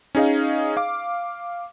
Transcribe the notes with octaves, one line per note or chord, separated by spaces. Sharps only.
C#4 D#4 G#4 D#5 F5
F5 D6